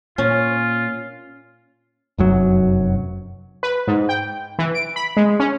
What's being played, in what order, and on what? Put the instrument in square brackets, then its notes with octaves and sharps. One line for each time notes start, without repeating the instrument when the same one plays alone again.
[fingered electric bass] A#2 [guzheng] C#4 [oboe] F4
[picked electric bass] F1 F#2 F#3
[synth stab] B4
G#2
G5
E3
D7
B5
G#3
C#4